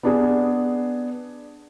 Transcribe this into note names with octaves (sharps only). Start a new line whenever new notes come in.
B3 D4 G#4